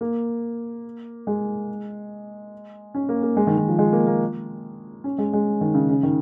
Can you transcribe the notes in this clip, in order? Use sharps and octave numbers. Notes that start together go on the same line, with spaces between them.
A#3
G#3
C#4
A#3
A#3
G#3
D#3
D#3
F3
G#3
A#3
A#3
C#4
G#3
G#3
D#3
C#3
C#3
D#3